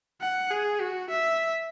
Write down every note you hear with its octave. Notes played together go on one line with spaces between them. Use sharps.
F#5
G#4
F#4
E5